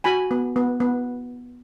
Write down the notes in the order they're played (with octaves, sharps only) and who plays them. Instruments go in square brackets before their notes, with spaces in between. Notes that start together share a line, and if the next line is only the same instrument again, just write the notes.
[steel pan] F#4 G#5 B5
B3
B3
B3